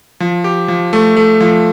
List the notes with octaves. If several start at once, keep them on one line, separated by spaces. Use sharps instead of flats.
F3
G4
F3
A3
A3
F3